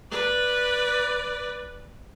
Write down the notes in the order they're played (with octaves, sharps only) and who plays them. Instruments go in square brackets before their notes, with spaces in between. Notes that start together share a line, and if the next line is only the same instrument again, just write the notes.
[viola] B4 D5